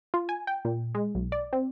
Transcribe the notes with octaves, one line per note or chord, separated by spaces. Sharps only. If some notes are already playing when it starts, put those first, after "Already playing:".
F4
G#5
G5
A#2
G#3
B1
D5
C4